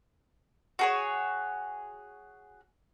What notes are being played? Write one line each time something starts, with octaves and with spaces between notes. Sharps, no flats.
F#4 G#4 C#5